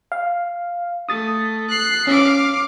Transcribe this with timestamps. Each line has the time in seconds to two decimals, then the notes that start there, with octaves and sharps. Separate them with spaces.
0.12 F5
1.09 A3 D#6 A6
1.70 F#6 C7
2.07 C#4 F5 D6